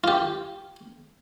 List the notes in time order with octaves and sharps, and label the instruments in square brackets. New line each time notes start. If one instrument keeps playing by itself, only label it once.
[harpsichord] F4 G4